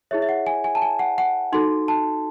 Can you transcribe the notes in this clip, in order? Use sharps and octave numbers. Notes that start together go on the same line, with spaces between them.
E4 G#4 C#5 E5
E5
F#5
G#5
G#5
A5
G#5
F#5
F#5
D#4 F#4 A4 C6
A5